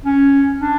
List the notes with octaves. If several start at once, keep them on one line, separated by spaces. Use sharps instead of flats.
C#4
D4